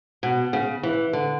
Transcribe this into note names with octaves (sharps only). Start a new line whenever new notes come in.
B2
C#3
E3
D3